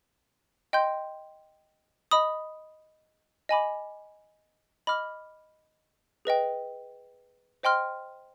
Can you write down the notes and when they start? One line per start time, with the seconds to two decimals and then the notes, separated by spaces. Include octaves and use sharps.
0.73 D#5 G5 C6 G6
2.11 D#5 B5 D#6
3.49 D#5 G#5 B5 D6
4.87 D#5 B5 D6 F6
6.25 G#4 B4 D#5 G5
7.63 C5 D#5 G5 C6 F6